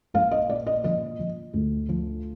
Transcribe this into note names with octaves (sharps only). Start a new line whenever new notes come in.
A#1 F5
D#5
A#2 D5
D#5
F3 D#5
F3
D2
F3